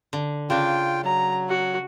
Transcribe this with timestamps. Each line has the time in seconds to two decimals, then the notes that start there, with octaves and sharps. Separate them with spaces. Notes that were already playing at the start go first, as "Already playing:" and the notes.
0.13 D3
0.50 C#3 D4 F4 G5
1.04 F#3 A#5
1.49 F#4